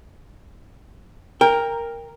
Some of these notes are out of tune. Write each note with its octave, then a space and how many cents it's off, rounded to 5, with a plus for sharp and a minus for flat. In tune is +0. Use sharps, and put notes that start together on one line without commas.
A#4 +0 G5 +25